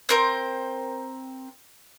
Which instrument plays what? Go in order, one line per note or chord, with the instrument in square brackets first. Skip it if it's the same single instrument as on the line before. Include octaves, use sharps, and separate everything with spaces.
[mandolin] C4 A#4 C5